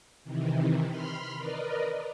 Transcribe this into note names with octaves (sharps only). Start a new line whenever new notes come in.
C3 D#3 E3
B5 C6 F6
A#4 B4 D5 D#5